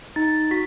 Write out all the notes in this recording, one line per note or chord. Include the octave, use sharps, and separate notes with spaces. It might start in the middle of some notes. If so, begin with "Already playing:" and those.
D#4 A6
F#4 B6